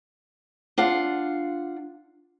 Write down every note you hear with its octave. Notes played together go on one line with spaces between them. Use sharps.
D4 F4 F5 F#5